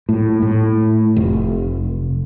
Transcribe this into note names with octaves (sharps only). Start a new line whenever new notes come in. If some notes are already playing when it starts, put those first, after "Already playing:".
A2
A2
F1